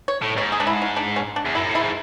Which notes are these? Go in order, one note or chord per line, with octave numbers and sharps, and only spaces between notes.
C#5
A2
G#2 C#5
G#4
D4
E4
C#4
D4
C#4
D4
E2
F#2 E4
A2
G#2 E4